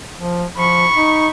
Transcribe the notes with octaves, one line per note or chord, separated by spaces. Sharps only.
F3
F3 B5 C#6
D#4